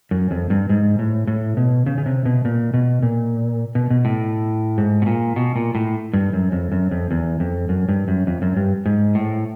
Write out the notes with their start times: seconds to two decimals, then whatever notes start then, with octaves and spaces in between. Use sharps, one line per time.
0.11 F#2
0.31 F2
0.50 G2
0.69 G#2
0.99 A2
1.27 A2
1.57 B2
1.86 C#3
1.98 C#3
2.06 C3
2.25 B2
2.45 A#2
2.74 B2
3.02 A#2
3.75 B2
3.90 B2
4.05 A2
4.78 G#2
5.02 B2
5.06 A#2
5.36 B2
5.56 A#2
5.75 A2
6.13 G2
6.33 F#2
6.52 F2
6.72 F#2
6.91 F2
7.11 E2
7.40 F2
7.69 F#2
7.89 G2
8.08 F#2
8.27 F2
8.42 F#2
8.57 G2
8.86 G#2
9.15 A2